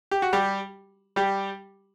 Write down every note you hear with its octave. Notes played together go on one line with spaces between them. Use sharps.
G4
F#4
G3 G4
G3 G4